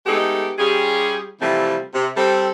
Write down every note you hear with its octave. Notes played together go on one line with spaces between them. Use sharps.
G#3 A3 B3 D#4 G4 A4
G3 C#4 F4 G4 G#4
C3 E3 F3 G3 A3 C4
C3
G3 C4 A4